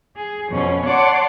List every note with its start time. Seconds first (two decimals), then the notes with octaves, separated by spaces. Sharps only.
0.15 G#4
0.49 F2 B2 C#4
0.84 C#5 D5 F#5 A5 C6 D6